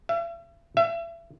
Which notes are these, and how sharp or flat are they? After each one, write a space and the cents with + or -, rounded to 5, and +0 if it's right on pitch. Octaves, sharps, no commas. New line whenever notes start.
E5 +45
E5 +35